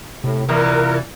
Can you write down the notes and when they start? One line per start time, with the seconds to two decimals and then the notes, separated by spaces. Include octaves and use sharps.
0.24 A2 C3
0.49 A#2 E3 A#4